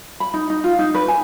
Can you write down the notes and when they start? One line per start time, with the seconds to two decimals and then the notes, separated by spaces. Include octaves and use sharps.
0.20 B5
0.34 D#4
0.50 D#4
0.64 F4
0.79 D#4
0.95 B4
1.08 G#5